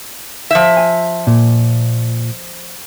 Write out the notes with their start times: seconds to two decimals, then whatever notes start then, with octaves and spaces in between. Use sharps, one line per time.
0.51 F3 E5
0.77 G#5
1.27 A#2